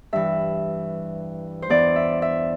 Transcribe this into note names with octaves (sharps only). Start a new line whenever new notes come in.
G2 E3 E5
C5
E2 E3 D5
E5
E5